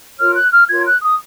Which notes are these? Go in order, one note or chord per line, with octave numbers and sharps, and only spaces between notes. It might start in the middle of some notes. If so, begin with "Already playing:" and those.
F4 A#4 C#5 F6
F#6
F6
F4 A#4 C#5 G#6
F#6
D#6